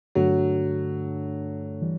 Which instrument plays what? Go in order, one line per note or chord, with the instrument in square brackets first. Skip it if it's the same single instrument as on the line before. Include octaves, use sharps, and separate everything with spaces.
[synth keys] G2 D3 A3 D4 A4 [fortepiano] F#3
[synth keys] E3 G3